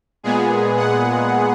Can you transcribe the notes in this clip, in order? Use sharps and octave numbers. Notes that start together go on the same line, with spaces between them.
A#2 G#3 B3 G#4
F#5